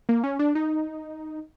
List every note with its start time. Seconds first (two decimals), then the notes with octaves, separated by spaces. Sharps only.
0.09 A#3
0.24 C#4
0.39 D4
0.55 D#4